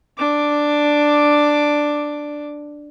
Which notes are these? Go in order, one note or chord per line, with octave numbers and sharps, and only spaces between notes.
D4 D6